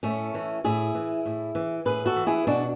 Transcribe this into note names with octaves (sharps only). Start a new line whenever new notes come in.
A2 A3 C#4
E3
A2 E4 G#4
E3
A2
E3
A2 G#4 B4
F#4 A4
E3
E4 G#4
B2 D4 F#4